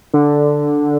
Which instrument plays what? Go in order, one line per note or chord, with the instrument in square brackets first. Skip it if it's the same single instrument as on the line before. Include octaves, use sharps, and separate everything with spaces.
[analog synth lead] D3